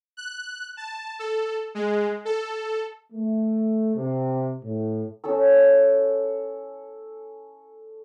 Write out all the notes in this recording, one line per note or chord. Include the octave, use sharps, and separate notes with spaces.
F#6
A5
A4
G#3
A4
A3
C3
A2
C#4 A4 A5 E6